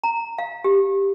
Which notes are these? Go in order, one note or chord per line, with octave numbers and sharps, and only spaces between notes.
A#5
F5
G4